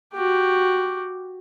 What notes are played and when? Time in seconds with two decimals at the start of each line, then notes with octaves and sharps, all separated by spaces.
0.14 F#4 G4